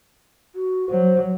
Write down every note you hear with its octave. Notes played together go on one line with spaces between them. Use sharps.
F#4
F#3 C5